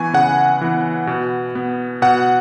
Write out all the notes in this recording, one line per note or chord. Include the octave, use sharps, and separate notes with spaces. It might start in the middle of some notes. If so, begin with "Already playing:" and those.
Already playing: E3 B3 G#5 C#6
C#3 F#5
E3 B3
B2
B3
B2 F#5